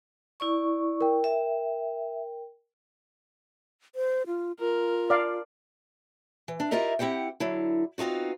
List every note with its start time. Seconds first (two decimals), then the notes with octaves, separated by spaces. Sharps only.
0.40 E4 D5 C#6
1.01 A#4 G5
1.24 E5
3.95 C5
4.27 F4
4.60 F4 A#4
5.10 D5 F5
6.48 E3
6.60 D4
6.71 E4 F4 G4 A#4 D#5 E5
6.99 C4 E4 G4 F#5 G5
7.40 D3 F#3 E4
7.98 B3 C4 D#4 F4 F#4